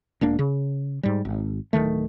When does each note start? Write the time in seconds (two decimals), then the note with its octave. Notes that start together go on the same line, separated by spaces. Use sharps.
0.21 E1 A#3 D4
0.39 C#3
1.03 G#2 G3
1.25 G#1
1.73 D1 C2 D#3 A3